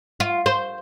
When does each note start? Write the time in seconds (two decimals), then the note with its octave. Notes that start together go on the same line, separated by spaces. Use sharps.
0.20 F4
0.46 C5